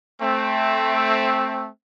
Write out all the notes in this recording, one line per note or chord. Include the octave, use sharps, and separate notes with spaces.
A3 C4